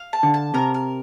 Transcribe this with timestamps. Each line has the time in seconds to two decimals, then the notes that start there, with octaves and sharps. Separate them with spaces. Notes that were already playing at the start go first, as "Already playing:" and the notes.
Already playing: F5
0.13 A5
0.23 D3
0.34 A5
0.54 C3 A#4
0.74 A#4